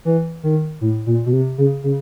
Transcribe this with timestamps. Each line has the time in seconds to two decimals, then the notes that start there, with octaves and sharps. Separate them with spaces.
0.05 E3
0.43 D#3
0.81 A2
1.07 A#2
1.26 B2
1.33 C3
1.58 C#3
1.84 C#3